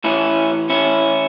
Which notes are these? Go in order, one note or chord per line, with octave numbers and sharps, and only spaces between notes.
A2 E3 C#4 E4
C#4 E4